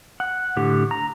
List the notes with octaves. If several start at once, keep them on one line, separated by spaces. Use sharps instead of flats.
F#5
A2 D3 G4
A#5